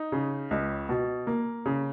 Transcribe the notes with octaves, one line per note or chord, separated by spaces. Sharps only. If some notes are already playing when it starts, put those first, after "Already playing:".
Already playing: D#4
C#3
C#2
B2
A#3
C#3